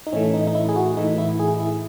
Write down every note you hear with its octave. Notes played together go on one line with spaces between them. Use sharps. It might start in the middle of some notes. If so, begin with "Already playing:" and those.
D#4
A2 E3 A3 C#4
D#4
D#4
E4
G#4
F#4
A2 E3 A3 D#4
E4
G#4
E4